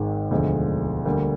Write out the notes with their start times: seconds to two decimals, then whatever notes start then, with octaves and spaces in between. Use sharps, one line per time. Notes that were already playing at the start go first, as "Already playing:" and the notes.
Already playing: G#1 G#2 D#3 G#3
0.31 E1 D2 D3 F3 G#3
1.06 D2 D3 G3 A#3